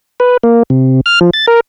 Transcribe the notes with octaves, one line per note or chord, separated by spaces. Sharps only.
B4
A#3
C3
F6
F3
A6
A#4